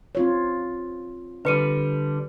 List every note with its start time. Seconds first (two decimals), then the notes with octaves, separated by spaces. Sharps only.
0.15 C4 F4 C#5
1.45 D3 G3 B4 C#7 D#7